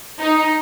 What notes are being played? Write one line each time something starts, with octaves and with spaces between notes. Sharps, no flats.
D#4